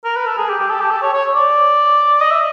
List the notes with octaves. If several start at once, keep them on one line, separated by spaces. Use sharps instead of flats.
A#4
B4
A4
G#4
G4
G4
A4
G4
A4
C#5
C#5
D5
D#5
E5